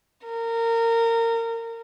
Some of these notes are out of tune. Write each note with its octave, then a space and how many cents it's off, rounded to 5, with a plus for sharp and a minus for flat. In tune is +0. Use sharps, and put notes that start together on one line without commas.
A#4 -25